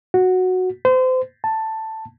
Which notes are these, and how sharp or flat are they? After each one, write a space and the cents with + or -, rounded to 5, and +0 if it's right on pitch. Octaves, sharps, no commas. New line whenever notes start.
F#4 -5
C5 -30
A5 +5